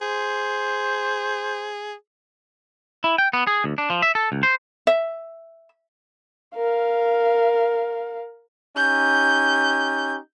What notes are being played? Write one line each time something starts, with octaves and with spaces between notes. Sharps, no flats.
G#4 C5
E4
G5
B3
G#4
D2
D4
F3
E5
A4
C#2
C5
E5
A#4 F5
C#4 D#4 G4 G6